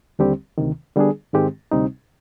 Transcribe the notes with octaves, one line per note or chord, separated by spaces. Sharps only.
D#2 D3 G3 C4 G4
D2 C3 D#3
D3 G3 B3 D4 G#4
G#2 D#3 G#3 C4 G4
D2 C3 G3 C4 D#4